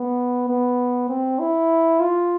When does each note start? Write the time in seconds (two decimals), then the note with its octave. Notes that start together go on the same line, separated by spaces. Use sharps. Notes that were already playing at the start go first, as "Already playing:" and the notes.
Already playing: B3
0.49 B3
1.09 C4
1.39 E4
2.00 F4